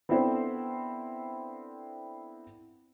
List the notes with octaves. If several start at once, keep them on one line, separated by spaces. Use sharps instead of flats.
B3 C4 D4 E4 A4 C5